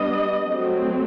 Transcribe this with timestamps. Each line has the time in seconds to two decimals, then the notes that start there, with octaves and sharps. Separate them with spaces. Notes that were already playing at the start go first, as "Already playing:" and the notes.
Already playing: G3 B3 D4 D#5
0.46 F#3 A3 C4